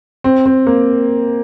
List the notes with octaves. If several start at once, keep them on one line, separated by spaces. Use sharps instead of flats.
C4
C4
A#3